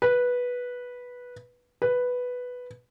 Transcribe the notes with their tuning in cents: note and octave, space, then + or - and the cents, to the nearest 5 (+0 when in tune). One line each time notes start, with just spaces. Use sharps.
B4 -10
B4 +0